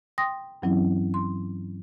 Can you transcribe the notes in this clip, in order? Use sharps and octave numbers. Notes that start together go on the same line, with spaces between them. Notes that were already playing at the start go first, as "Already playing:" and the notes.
G5 C6 D#6 A#6
G2 E3 F#3 C4 C#4 E4
C6